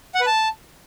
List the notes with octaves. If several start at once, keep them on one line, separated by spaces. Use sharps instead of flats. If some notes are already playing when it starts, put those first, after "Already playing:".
F#5
B4
A5